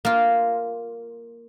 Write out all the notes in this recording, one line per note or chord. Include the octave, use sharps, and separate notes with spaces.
A#3 F4